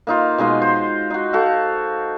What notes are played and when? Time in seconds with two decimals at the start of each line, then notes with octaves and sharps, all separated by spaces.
0.07 A#3 D#4 F4
0.38 B2 G#3 D#4 F5
0.62 C5
1.10 D#4 F#4
1.33 F#4 A4 F5